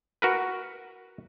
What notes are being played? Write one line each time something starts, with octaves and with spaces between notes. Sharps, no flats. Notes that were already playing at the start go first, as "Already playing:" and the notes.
F#4 A#4 B4